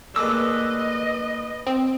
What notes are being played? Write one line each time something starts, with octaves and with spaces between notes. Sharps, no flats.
A#2 G#3 A3 B4 D#5 D6 E6
C4